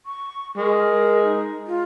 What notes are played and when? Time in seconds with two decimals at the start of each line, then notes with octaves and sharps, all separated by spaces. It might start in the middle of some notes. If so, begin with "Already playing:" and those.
0.06 C#6
0.57 G#3 A#4
1.22 D#4
1.66 F4